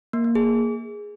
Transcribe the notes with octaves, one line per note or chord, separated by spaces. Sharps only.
A#3
A#3
G#4